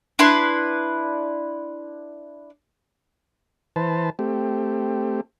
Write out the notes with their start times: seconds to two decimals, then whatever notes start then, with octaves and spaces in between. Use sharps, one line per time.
0.19 D4 E4 B4 C6
3.76 E3 B4 C5 A5
4.19 A3 C4 G4